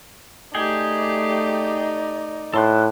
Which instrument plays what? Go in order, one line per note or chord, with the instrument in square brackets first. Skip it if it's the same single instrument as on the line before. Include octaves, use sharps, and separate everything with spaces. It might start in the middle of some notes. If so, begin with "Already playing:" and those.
[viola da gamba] A3 G4 [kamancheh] D#4 D5 [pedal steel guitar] G#4 G5
[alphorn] A2 [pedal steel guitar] A4 C6 F#6